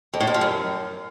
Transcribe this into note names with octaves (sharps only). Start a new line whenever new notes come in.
F2
A2
F2
F3
F#2